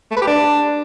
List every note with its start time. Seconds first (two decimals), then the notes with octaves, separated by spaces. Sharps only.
0.11 A3
0.16 B4
0.22 G4
0.27 D4